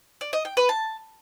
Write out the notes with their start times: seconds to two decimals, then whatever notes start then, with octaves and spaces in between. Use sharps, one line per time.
0.21 D5
0.33 D#5
0.45 G5
0.57 B4
0.69 A5